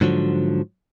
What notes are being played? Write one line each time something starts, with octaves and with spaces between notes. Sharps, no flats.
G#2 D3 F3 F#3